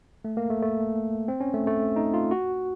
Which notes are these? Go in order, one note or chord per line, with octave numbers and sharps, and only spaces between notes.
A3
A#3
A3
A3
C4
C#4
A3
A3
D#4
F4
F#4